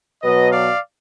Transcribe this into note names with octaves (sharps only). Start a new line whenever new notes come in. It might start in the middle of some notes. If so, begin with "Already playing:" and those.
B2 F#3 B4 D#5
D5 F5